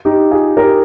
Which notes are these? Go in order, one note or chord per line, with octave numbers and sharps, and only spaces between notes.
D#4 G4
F4 G#4
G4 A#4